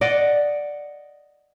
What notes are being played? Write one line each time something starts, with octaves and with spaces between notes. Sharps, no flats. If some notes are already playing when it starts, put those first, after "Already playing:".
D5 D#5 F#5